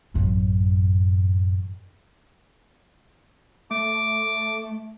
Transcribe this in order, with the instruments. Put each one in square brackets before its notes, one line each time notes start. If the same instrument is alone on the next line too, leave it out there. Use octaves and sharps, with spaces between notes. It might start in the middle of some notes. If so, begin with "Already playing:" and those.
[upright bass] A1 F#2
[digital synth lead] A3 [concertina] D6